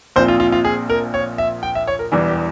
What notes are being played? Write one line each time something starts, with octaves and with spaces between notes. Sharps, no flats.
A#1 A#2 F3 C4 C5
F4
F4
F4
G#4
A#4
C#5
E5
G5
E5
C#5
A#4
E1 E2 E3 G3
G4